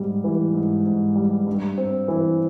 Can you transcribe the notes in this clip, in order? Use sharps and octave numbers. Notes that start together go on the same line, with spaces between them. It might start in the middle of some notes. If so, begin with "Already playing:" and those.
Already playing: G#2 G3
E3
G#2
G#2
G3
G2
C4
E3